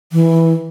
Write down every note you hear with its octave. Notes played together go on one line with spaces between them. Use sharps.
E3